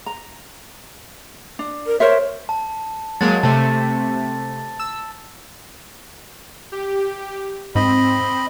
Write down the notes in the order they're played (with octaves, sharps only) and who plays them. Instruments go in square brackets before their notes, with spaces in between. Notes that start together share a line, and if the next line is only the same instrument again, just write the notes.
[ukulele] A#5
D4
[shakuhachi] A#4
[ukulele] A#4 C5 E5 [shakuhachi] C#5
[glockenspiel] A5
[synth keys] F#3 G#3 A#3 [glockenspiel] A6
[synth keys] C3 A3 [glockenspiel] A5
[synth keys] E6
[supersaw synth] G4
[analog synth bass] G#2 [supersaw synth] C4 [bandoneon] D#5 B5